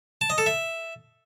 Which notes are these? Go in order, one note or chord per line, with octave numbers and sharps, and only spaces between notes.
A5
D#5
A4
E5